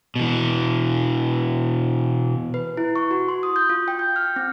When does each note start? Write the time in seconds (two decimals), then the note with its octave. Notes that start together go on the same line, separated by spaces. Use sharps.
0.16 B2 E3
2.54 B4
2.77 E4
2.96 C#6
3.11 F#4
3.28 C6
3.43 D#6
3.56 G6
3.69 F4
3.88 G5
3.99 G6
4.16 F6
4.36 C4